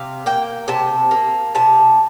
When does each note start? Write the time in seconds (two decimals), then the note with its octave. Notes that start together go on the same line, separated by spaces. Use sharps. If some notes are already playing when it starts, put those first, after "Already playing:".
Already playing: C3 F5
0.26 A#3 G5
0.68 C3 A5
1.11 A#3
1.55 C3 A5